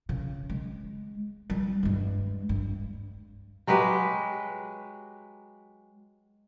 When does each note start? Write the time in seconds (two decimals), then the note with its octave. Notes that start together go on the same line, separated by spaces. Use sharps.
0.09 C#3
0.50 G#3
1.50 G3
1.83 G2 G#3
2.49 G2
3.67 F#3 G#3 G4 B4